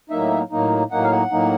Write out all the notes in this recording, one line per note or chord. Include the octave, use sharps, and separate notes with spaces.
A2 F#3 A#3 D#4 E5
A2 F#3 A#3 D#4
A2 F#3 A#3 D#4 F#5
F5
F#5
A2 F#3 A#3 D#4